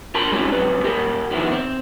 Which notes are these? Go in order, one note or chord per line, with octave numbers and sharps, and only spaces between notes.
F4 A#4 A5 B5 C6
G3 G#3 C4 C#4 D#4 F4
C#2 F#2 C3 B4
A#2 G4 A#4
D#3 F3 B3 E4
C4